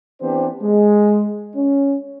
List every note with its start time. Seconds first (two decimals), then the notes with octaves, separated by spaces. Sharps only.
0.21 E3 B3 C4 D4 G4 C5
0.62 G#3
1.55 C#4